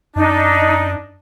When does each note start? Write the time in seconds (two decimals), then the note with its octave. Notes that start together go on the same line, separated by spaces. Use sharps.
0.16 F#2 D4 D#4